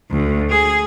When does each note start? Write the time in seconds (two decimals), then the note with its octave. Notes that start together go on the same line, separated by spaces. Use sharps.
0.11 D2
0.50 G#4